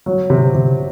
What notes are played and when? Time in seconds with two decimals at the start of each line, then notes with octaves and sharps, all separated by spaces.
0.06 F#3
0.30 C3
0.55 C3